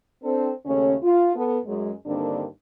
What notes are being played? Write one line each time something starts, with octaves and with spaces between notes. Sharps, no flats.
C4 D4 A4
D#2 C#3 A3 C#4
F4
B3 A4
F#2 G#3
G2 D3 D#3 A#3 C4 D4